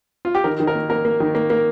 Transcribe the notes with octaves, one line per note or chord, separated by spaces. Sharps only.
F4
G4
D#3 A#4
D#3
A#4
A#3
A#3 A#4
A#3
D#3
A#3
A#3